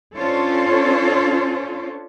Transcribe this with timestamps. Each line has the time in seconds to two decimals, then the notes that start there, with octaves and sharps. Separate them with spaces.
0.15 C#4 D4 F4 A4 C5 C#5